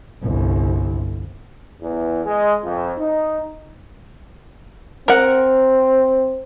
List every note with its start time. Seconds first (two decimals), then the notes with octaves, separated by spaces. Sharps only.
0.22 G1 C2
1.81 E2
2.24 G#3
2.62 F2
2.98 D#4
5.08 C4 A#4 F#5